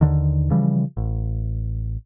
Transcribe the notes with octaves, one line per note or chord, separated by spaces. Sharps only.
D#2 D3 D#3
C#3 E3 F3 G3
A1